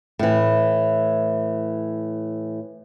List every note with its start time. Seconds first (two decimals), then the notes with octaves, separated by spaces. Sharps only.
0.19 A2 E3